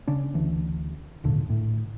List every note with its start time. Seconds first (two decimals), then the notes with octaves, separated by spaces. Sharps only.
0.08 C#3 C#4 D4
0.34 D2 E3
1.24 G#1 D#2 A#2 D3
1.50 A2